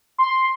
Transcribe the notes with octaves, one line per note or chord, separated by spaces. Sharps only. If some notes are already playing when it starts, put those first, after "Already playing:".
C6